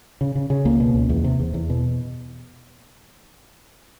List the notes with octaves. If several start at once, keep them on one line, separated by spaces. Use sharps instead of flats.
C#3
C#3
C#3
C#2 A#3
B2
C#2
E2
C3
E2
E2
B2